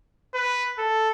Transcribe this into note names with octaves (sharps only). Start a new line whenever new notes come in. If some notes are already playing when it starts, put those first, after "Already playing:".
B4
A4